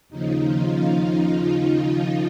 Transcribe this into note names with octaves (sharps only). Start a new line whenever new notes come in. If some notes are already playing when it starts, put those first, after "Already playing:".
D#2 C#3 F3 D#4
F4
F4